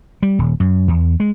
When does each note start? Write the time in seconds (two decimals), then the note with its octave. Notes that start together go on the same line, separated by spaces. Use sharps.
0.23 G3
0.39 D#1
0.60 F#2
0.88 E2
1.20 G#3